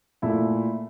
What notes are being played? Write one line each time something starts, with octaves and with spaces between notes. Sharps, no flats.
A#2 A3 E4